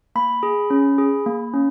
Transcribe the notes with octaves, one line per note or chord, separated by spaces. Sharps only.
A#3 B5
G#4
C#4
G#4
A#3
C#4